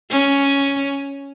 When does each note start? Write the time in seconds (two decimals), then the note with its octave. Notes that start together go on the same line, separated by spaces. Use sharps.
0.10 C#4